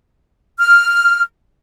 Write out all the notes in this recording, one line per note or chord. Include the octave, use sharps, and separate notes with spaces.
F6